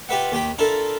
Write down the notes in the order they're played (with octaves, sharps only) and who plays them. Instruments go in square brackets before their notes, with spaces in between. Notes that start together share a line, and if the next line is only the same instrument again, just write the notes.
[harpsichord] F4 G4 B4 E5 F#5
D#2 G4 G5 B5
D4 E4 F4 A4 A#4